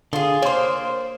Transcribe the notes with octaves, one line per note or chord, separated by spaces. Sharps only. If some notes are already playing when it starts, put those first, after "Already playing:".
D3 F4 G#4
A#3 C5 C#5 C6